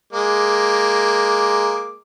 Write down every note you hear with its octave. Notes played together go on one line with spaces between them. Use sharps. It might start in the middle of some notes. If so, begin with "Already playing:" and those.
G#3 A#3 D6